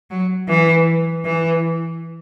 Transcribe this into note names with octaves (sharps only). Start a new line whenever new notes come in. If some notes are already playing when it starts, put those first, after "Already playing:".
F#3
E3
E3